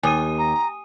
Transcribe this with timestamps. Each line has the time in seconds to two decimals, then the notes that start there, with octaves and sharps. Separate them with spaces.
0.03 D#2 G#5 D#6 D#7
0.38 A#5